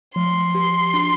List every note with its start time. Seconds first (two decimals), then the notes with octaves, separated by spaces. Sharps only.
0.16 F3 C6
0.55 G4
0.94 D4